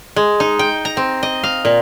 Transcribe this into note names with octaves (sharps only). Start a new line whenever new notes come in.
G#3
D#4
G5
A#5
C4
D#5
F5
A#2